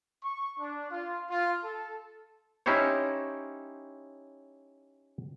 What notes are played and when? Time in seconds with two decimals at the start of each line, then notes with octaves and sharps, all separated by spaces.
0.24 C#6
0.59 D4
0.91 F4
1.30 F4
1.64 A4
2.66 C#4 D#4 E4 G4 C5 C#5